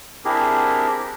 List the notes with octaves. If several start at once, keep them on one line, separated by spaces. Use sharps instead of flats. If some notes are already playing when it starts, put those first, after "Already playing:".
C4 D4 E4 G4 G#4 A#4